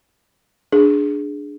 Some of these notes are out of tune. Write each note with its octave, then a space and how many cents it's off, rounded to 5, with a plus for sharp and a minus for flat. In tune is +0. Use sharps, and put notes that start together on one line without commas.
D4 +0 G#4 +0